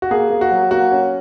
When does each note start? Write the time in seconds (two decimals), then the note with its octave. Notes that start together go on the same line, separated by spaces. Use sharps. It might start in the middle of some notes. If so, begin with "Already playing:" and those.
0.02 F#4
0.11 A#3 G#4
0.30 A#3
0.41 F#4
0.51 F#3
0.71 A#3 F#4
0.92 C#4